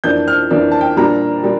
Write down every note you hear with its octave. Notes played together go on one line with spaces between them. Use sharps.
F2 E3 A#3 D4 G6
F6
F2 E3 A#3 D4
A5
G5
A#2 G3 A#3 D4 A#5
A#2 G3 A#3